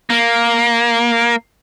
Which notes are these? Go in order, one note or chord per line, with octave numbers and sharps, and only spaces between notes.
A#3